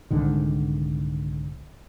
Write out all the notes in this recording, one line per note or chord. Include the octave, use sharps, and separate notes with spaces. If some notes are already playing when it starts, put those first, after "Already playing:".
C2 G#2 D3 D#3